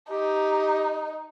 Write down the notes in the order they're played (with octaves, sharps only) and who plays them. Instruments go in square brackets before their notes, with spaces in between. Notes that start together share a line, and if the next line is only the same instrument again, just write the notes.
[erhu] D#4 [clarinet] G4